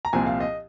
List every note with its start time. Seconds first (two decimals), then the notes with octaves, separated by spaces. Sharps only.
0.05 A#5
0.13 C2 A#2 F3 C4 G#5
0.27 F5
0.40 D#5